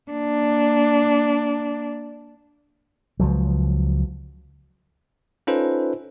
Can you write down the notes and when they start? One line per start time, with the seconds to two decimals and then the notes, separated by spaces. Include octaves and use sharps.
0.11 A#3 D4
3.20 C#2 F3 F#3
5.47 C#4 D#4 F4 A4 B4 C5